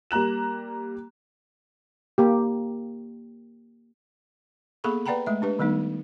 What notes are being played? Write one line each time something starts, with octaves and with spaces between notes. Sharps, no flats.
G3 A#3 A#5 F#6 E7
A#3 G4
A#3 B3 G#4 A4 B5 C#6
B4 D5 F#5 G5 A#5 B5
G#3 A3 E5
D4 G4 B4
D#3 G3 A3 B3 D#4